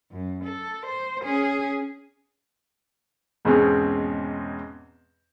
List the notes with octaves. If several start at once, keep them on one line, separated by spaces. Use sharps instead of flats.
F#2
A4
C5
C#4 G#4
E2 G#2 B2 G#3 C4 C#4